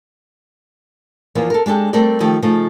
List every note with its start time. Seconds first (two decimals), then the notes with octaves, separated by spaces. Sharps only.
1.35 E2 E3 F3 A#3
1.50 A4 A#4
1.66 G#3 D4 G4 A4
1.93 G3 A3 C4 A#4 D5
2.20 D#3 F3 A3 G4
2.42 C#3 F3 A3 D#4